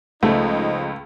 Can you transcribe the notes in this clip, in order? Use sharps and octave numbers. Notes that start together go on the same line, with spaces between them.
C#2 F3 A3 D#4